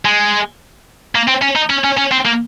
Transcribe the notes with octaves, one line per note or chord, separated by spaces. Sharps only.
G#3
A#3
C4
C#4
D#4
C#4
C#4
C#4
C4
A#3